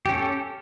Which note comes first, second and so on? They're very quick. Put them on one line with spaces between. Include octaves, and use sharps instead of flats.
G4 C#4 A4